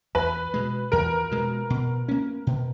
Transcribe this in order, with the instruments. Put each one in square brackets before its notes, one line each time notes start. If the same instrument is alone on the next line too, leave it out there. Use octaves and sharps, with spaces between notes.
[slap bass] E2 [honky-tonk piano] B4
[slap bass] B2 G#3
[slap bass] E2 [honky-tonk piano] A#4
[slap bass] B2 G#3
B2
A#3 C#4
B2